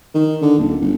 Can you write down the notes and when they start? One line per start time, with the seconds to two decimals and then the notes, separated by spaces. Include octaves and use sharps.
0.14 D#3
0.42 D3
0.58 D#1
0.81 G1